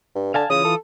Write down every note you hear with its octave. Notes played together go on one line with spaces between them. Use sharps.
G2
D3 F5 G#5 A5
C#3 E3 F4 D#6
A4